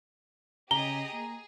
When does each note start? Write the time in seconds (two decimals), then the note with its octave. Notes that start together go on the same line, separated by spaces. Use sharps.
0.71 C#3 G4 G#4 D#5 A#5 G7
1.13 A#3 G#4